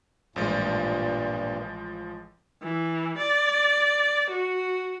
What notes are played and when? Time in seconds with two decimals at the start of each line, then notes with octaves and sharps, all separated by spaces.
0.36 A1 G2 A#2 F3 G#3
2.62 E3
3.18 D5
4.31 F#4